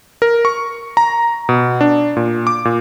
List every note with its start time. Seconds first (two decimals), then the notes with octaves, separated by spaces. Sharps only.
0.22 A#4
0.45 C#6
0.97 A#5
1.49 B2
1.81 D4
2.17 A#2
2.47 D6
2.65 A#2